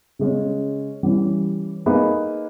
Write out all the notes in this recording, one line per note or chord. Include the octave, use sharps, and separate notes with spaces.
C#3 G#3 C#4
E3 G3 C#4
A#3 D#4 G#4 B4